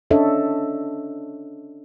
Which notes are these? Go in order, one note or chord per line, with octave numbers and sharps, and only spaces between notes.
C#4 D4 A4 C#5 D#5 E5